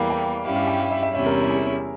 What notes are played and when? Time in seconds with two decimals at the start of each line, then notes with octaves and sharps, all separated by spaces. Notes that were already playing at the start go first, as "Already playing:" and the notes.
Already playing: E2 E3 G3 A#3 F5
0.10 G5
0.45 G2 G3 C#4 E4 G4 F5
0.56 F5
0.68 G5
0.79 F5
0.91 E5
1.03 E5
1.14 E2 C3 G3 C#4 E4 E5
1.26 A#4
1.50 G#4